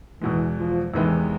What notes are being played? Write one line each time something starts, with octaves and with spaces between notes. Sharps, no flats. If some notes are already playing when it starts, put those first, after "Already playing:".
E2 B2 E3 G#3
F3
E2 C3 D#3 E3 G#3 B3